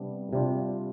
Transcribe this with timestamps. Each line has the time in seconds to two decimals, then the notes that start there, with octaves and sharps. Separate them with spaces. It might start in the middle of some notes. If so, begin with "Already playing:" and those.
Already playing: C3 G3 B3 D4
0.33 C3 G3 D4 F4